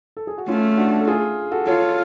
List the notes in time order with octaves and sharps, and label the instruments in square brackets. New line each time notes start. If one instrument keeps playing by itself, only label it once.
[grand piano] A4
G#4
F#4
[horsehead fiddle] A3 [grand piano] C#4 F4
[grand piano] D4 F#4
A4
F4 G#4
F#4 A4
[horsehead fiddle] F4 [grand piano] A4 C#5